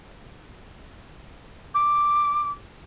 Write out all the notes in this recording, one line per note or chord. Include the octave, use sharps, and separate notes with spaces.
D6